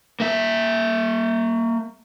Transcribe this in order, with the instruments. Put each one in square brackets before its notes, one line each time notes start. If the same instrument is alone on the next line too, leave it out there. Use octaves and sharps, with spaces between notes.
[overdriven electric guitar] A#3 E5